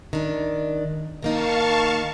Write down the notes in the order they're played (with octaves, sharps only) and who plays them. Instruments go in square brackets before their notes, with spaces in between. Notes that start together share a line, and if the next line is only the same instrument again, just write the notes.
[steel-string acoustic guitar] D#3 D4
[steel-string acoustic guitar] D#3 A#3 D#4 [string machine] F5 A5 C#6